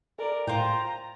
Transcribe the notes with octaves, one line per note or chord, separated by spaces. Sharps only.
A4 A#4 D5
A2 F4 C5 G5 A#5